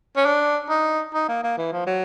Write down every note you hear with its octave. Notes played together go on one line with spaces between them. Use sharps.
C#4
D4
D#4
D#4
A#3
A#3
E3
F3
F#3